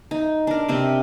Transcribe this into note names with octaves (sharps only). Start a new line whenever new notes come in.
D#4
D4 A#4
C3 C4 G4